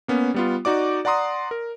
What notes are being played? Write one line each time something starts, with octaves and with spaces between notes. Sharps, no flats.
A#3 B3 C#4
G3 B3 F4
D#4 F#4 D5 D6
D5 F#5 A#5 C6 D#6
A#4